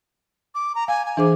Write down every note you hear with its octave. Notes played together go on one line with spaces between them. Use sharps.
D6
A#5
F5 G#5
G#5
E3 D4 G#4 C5 D6